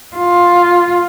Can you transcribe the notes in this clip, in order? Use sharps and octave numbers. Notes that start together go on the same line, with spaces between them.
F4